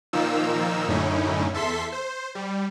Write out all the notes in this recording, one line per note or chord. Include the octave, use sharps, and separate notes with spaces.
A#2 D#3 F3 A#3 D#4 E6
F#2 A2 D3 C#4 D#4 E4
E2 A4 E5 C6 B6
C5
G3